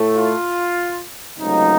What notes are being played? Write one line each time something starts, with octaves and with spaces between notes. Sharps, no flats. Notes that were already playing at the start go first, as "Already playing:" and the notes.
Already playing: A2 A3
F4
C#2 C3 F#3 A3 D#4